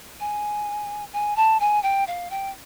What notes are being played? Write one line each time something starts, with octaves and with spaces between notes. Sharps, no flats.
G#5
G#5
A5
G#5
G5
F5
G5